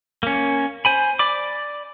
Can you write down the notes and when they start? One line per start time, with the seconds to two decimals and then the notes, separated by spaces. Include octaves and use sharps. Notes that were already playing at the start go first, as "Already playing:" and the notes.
0.23 A#3 C#4
0.85 C5 G#5 B5
1.19 D5 B5 D6